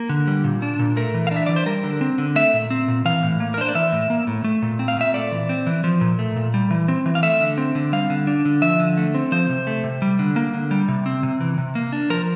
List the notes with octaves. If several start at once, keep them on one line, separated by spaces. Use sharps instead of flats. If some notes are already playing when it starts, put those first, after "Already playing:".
Already playing: A#3
D3
G3
A#2
D4
A#2
A3 A#4
E3
F5
D4
E5
E3 D5
C5
G3 A#4
D3
C4
D3
A3 E5
A#2
C4
A#2
E3 F5
A2
A#3
A#4
D4 C5
D5
E3 E5
A2
A#3
A2
A3
A#2
C4
F5
A#2 E5
A3 D5
E3
C4
E3
F3
A#2
A3
A#2
G3
E3
C4
E3
F5
A3 E5
D3
C4
D3
G3 F5
D3
D4
D3
F3 E5
D3
A3
C4
F3 C5
C3
A3
C3
G3
D3
A#3
D3
G3
C3
C4
C3
E3
C3
A#3
D4
F3 A#4